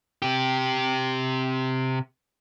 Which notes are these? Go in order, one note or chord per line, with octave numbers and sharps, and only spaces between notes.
C3 G4